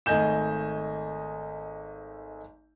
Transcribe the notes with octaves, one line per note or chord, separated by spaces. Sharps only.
G#1 A3 D#5 G#5 G6 E7